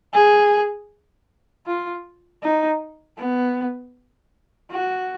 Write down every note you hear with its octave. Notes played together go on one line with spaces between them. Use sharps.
G#4
F4
D#4
B3
F#4